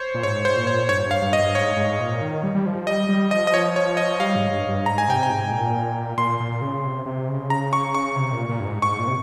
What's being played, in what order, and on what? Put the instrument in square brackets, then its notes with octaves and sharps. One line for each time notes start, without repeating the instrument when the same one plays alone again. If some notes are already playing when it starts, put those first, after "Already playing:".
Already playing: [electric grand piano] C5 C#5
[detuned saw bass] A#2
[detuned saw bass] G#2 [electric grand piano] C#5
[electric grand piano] C5
[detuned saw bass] A#2
[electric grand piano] C#5
[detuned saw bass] G2 [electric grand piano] C#5
[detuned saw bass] G2
[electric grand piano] F5
[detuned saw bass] G2
[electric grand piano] D#5
[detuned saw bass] G2
[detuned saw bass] G#2 [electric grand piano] C#5
[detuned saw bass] G#2
A#2
D#3
G3
G3
F3
[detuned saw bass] G3 [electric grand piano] D#5
[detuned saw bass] G3
[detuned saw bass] F3 [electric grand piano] D#5
[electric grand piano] D#5
C#5
C#5
D#5
[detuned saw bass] G3 [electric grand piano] F5
[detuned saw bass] G#2
G2
G2
[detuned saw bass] G#2 [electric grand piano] A#5
[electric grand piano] G#5
[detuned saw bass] C3 [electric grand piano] G5
[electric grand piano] G#5
[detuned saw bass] G#2
A#2
[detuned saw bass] A#2 [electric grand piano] C6
[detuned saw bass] A#2
C#3
C3
C3
C#3
[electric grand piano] A#5
C#6
C#6
[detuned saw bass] C3
A#2
A#2
G2
G#2
[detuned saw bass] G#2 [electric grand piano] C#6
[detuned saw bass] A#2
C3